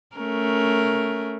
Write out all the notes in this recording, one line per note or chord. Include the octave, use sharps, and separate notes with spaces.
A3 C#4 A#4